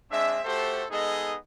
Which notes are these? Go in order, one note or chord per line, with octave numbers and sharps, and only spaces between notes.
G#3 C4 D4 E5
A3 F#4 G4 A4 C5
G#3 B3 D#4 G#4 A4 D#5